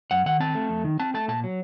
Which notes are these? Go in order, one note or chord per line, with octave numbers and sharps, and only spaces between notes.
F#2 F#5
D#3 F#5
C4 A5
A3
F2
D#3
C4 A5
A3 A5
A#2 A5
F#3